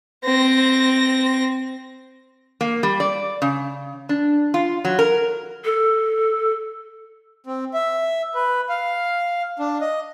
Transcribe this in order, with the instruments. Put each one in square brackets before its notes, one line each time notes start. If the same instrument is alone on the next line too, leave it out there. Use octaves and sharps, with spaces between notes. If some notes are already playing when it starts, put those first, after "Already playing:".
[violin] C4 A#6
[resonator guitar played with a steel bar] A#3
G3
D5
C#3
D4
F4
F#3
A#4
[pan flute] A4
[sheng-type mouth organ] C4
E5
B4
F5
D4
D#5